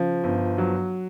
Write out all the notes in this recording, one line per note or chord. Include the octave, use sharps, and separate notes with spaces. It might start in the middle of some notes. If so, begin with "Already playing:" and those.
Already playing: C#3 F3
G1
F#3